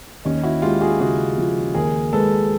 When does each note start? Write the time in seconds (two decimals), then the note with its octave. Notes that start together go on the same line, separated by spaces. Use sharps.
0.25 D#2 C#4 D#4
0.43 E4 F#4
0.62 G#3 F4 G4
0.81 F#4 G#4
1.00 C#3 F#4 G#4
1.38 F3
1.75 D#2 G#4 A#4
2.13 G#3 A4 B4